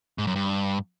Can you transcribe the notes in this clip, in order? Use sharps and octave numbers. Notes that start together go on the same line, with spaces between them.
G#2
F#2
G2